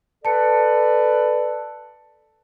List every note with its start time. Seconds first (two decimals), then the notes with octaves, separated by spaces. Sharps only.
0.25 A4 B4 D5 A5 C#7